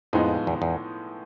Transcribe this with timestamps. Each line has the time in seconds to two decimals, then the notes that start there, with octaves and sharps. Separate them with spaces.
0.13 F2 A2 F3 G#3 B3 D#4
0.47 E2
0.62 E2